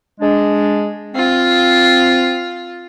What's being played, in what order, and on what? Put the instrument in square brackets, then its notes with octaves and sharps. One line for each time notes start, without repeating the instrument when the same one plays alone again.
[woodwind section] G#3 D4
[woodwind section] C4 [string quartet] F4